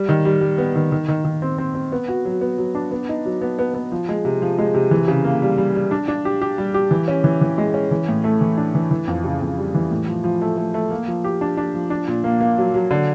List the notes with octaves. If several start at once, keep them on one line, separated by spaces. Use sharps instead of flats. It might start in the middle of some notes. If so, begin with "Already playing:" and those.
Already playing: G3
D#3
G3
G3
B3
D#3
D#3
D#3
D#3
C4
C4
C4
B3
F#4
F#3
B3
F#3
D4
B3
D#4
F#3
B3
B3
B3
F3
G#3
C3
F3
G#3
C3
E3
C#3
A#3
G3
G3
G3
D4
D4
G4
G4
G3
G4
E3
C#4
E3
E3
G#3
C#4
E3
A2
A3
E3
D4
E3
E3
F2
C#3
F2
G3
E3
A2
F3
F3
A3
A3
A3
A#3
F3
G4
D4
D4
F3
D4
A#2
A#3
A#3
F#3
F#3
D3